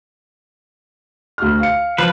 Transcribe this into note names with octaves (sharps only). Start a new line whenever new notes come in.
D2 F#4 F6
F5 C#7
F3 B4